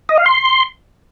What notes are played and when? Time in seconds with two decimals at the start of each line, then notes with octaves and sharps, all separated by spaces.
0.09 D#5
0.17 F5
0.26 C6